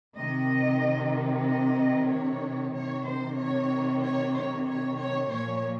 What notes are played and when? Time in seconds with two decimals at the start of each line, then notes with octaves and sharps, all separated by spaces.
0.18 C3 D#3 D#5
1.46 D#5
2.11 C#5
2.74 C3 D#3 C#5
3.06 C5
3.38 C#5
4.02 C#5
4.34 C#5
4.66 C#5
4.99 C#5
5.30 A#2 F3 C#5